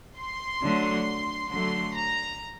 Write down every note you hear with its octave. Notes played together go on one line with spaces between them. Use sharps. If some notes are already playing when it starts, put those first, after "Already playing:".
C6
D3 F#3 A3
D3 F#3 A3 C6
A#5